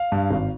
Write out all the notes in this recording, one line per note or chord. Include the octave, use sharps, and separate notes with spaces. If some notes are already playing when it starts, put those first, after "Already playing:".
Already playing: F5
G2
G#1